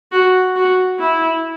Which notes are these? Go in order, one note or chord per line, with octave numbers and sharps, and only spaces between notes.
F#4
F#4
E4